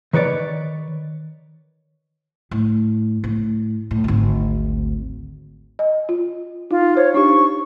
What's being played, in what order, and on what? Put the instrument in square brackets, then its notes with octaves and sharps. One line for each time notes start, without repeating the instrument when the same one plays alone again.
[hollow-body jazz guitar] D#3 B4 C#5 D5
[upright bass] A2
A2
A2
G#1 D2
[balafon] D#5
F4
[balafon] D#4 [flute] F4
[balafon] C5 [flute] C#5
[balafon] D4 D#4 G4 [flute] C#6